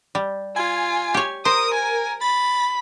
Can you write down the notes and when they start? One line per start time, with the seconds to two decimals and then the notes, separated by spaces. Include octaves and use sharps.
0.15 G3
0.56 F4 G#5
1.14 G4 C#5
1.45 A#4 C5 D#6
1.74 G#5
2.21 B5 A6